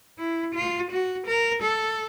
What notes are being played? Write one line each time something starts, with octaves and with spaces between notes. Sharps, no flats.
E4
F4
F#4
A#4
A4